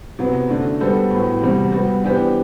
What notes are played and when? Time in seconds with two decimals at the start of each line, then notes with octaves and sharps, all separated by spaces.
0.19 C3 F#3 B3
0.49 F#2 D3 A3 D4
0.80 G3 B3 F#4 A4 C5
1.10 A2 F#3 B3
1.41 E2 C3 G3 C4 F#4
1.72 G3 B3 F#4
2.03 E3 B3 D4 G4 C5